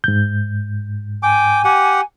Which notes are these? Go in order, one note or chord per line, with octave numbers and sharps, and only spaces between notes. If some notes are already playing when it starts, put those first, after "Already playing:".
G#2 G6
G5 G#5 D6
G4 F#5